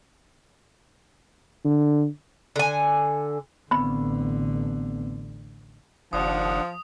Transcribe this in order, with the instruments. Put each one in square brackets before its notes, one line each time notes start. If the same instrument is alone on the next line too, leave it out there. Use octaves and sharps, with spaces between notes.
[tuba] D3
[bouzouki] D3 G#5
[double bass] A1 D3 [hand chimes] B3 C4 [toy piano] B5
[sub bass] F#1 [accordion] D#2 D4 F#5 [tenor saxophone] F3 [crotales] D#6